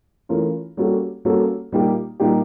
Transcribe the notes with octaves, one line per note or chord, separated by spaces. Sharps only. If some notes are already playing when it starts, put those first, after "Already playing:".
E3 A3 C#4 F4 A#4
G3 A#3 C#4 F#4 A4
G3 A#3 C#4 F#4 A4
A#2 G3 A#3 D#4 G4
A#2 G3 A#3 D#4 G4